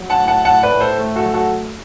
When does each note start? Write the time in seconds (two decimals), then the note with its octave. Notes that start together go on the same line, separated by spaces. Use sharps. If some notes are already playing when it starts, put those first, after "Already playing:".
Already playing: F#3
0.10 F#5 A5
0.19 A2
0.28 F#5 A5
0.45 A2 F#5 A5
0.63 B4 D5
0.72 A2
0.80 A4 C5
0.98 A3
1.16 F#4 A4
1.25 F#3
1.34 F#4 A4